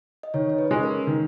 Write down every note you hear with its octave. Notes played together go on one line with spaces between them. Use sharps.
D#5
D#3 C#5
C#5
B4
G#3 C#4
A#4
D#3